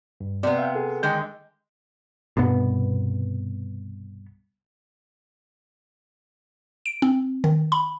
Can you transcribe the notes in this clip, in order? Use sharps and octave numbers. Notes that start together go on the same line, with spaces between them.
G2
C3 B3 D5
E5 F5 G5
G#4 A4
D3 D#3 G#3 G5 G6
C2 G2 B2 B3
D7
C4
D#3
B5